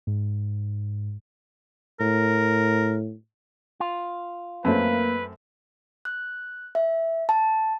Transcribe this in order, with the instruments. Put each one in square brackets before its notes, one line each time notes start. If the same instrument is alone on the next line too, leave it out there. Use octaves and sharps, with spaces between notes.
[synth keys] G#2
[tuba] A2 [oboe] A#4
[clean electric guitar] F4
[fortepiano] F#2 A3 C4 [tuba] A#3 [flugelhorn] B4
[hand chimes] F#6
E5
A5